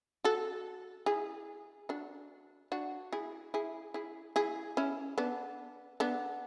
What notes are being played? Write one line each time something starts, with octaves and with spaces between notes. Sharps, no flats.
F#4 A4
E4 G#4
D4 F#4
D4 F#4
E4 G#4
E4 G#4
E4 G#4
E4 G#4
C#4 E4
B3 D4
B3 D4